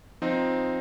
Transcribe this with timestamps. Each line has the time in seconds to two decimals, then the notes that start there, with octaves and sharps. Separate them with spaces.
0.22 F3 C4 D#4